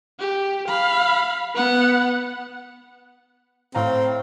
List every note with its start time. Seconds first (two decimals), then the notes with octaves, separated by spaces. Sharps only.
0.19 G4
0.68 F5 B5
1.54 B3 F#5
3.75 A2 C4 F5 A#5